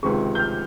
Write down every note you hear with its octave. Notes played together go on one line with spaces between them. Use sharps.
C#2 C3 D#3 G#3 C#6
G6
F6